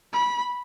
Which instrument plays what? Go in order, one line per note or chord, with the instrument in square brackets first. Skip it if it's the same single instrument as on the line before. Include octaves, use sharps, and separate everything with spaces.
[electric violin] B5